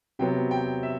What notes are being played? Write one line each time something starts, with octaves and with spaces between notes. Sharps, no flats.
C3 F#3 B3 G5
G5
E5